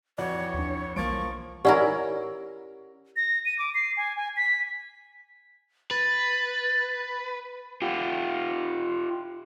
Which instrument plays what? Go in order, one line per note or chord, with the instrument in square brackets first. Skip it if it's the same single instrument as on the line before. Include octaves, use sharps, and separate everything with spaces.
[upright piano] F2 F#4 D5 [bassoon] E3 [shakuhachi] C#5
[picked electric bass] D#2 D4
[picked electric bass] B1 E3 G3 [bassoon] F3 [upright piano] A#3 A6 D7 [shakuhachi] C#6
[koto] C#4 E4 A#4 [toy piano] G4 D5 F#5
[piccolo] A#6
D#7
D6
C7
G#5
G#5
B6
[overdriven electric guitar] B4 [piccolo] A6
[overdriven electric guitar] F4 G4